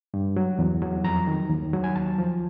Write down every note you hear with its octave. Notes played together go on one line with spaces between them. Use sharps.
G2
F#3
E2
F#3
F2 A#5
D#3
D#2
F#3
G#5
D#2 A5
F3